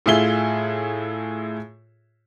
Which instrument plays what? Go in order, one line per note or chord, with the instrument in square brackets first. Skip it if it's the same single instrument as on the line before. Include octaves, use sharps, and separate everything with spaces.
[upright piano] A2 F4 G#4 E5 G7